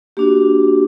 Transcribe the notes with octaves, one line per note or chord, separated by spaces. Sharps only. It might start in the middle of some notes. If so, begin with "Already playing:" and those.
A#3 D4 F#4 G4